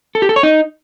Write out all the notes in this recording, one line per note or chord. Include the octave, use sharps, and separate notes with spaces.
A4
G4
A4
C#5
D#4